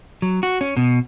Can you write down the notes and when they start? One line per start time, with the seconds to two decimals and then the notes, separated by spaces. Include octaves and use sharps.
0.22 F#3
0.43 F#4
0.61 C#4
0.77 B2